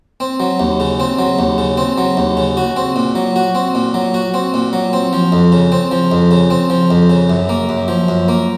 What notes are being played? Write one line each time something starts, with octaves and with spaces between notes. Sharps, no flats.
C4
F#3
D#2
C#3
C4
F#3
D#2
C#3
C4
F#3
D#2
C#3
F#4
C4
A#2
F#3
F#4
C4
A#2
F#3
F#4
C4
A#2
F#3
C4
F3
F2
C#3
C4
F3
F2
C#3
C4
F3
F2
C#3
F#2
A#3
F#2
F3
F#2
A#3